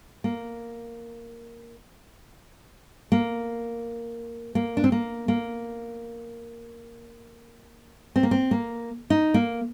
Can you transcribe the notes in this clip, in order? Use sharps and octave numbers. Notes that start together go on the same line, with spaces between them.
A#3
A#3
A#3
D4
C4
A#3
A#3
C4
A#3
C4
A#3
D#4
A#3